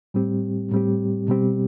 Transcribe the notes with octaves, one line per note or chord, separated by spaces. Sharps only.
A2 G3 C4 G4
A2 G3 C4 G4
B2 G3 C4 G4